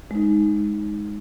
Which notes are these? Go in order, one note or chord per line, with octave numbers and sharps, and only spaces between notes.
G#3 D#4